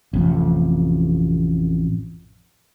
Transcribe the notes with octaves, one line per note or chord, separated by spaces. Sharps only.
A1 F2 C3